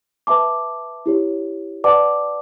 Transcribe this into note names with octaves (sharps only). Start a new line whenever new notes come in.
B4 E5 A5 D6
E4 G4 C#5
B4 D5 F#5 A5 D6